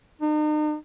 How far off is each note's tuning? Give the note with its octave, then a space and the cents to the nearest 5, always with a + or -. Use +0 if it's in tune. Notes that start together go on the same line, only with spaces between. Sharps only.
D#4 -40